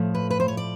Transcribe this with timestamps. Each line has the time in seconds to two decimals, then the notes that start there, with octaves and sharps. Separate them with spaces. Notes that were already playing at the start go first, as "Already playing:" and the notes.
Already playing: A2 F3 A3
0.15 B4
0.30 B4
0.40 C5
0.48 C#5
0.57 D5